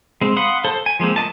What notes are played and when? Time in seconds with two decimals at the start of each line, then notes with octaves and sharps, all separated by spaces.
0.21 G#3 C4
0.37 F5 F#5 B5 C6 D#6
0.65 A4 C5
0.86 G#5
1.00 F3 G#3 A#3 C4
1.16 A3 A#3 D#5 A5